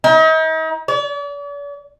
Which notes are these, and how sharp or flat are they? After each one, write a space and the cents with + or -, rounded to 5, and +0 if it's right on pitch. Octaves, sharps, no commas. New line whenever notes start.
D#4 +40
D5 -45